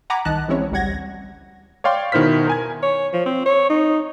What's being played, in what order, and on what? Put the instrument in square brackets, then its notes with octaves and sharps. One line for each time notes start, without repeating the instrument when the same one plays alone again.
[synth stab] F#5 G#5 A#5 B5 D6
C2 D#3 D#5 A5 F#6
E3 G#3 C4 C#4 E4 C#5
A1 D2 G3 F#5 G#6 A#6
[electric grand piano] C#5 D5 F5 G5 C6
B2 D#3 E4 C5 F6 B6
A#4 G#5 G#6
[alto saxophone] C#5
F3
C4
C#5
D#4